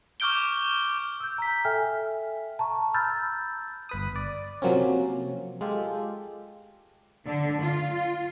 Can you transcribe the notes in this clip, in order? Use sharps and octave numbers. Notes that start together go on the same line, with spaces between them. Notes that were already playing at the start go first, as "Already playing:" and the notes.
C#6 D6 F6 G6 D7 G7
E6 G6
A#5 B6
A4 E5 G5 G#5 F6
A5 A#5 C#6
A#5 B5 E6 F6 G6 A6
G1 B4 D#6
D5
C3 F3 F#3 A#3 C4 C#4
G#3 F4 G4 A4
D3
F4